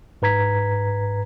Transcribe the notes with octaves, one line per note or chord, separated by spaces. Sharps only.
G#2 B4 A#5 G#6 B6